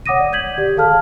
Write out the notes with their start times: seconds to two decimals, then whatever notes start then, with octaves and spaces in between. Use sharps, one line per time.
0.06 C#5 F#5 D6 D#6 A#6 D#7
0.19 D5
0.33 G6 G#6 B6 F#7
0.58 G4 D5
0.76 G#4 A4 F5 A5 F6